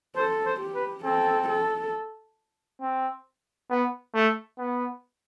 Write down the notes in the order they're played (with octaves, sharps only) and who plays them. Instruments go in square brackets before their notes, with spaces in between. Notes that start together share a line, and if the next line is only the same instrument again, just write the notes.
[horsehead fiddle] A4 [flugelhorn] C5
[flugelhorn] C5
[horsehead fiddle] G4
[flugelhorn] B4
[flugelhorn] C4 [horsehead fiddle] A4
[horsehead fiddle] A4
[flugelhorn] C4
B3
A3
B3